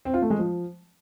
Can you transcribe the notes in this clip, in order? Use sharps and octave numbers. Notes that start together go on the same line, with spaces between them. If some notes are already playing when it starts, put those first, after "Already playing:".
C4
F4
A3
G#3
F3